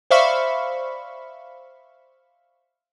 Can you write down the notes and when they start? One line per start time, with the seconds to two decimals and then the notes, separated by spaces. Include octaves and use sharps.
0.11 C5 D5 E5 F5 B5 C#6